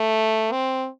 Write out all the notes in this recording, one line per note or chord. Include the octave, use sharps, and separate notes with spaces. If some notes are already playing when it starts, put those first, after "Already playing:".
Already playing: A3
C4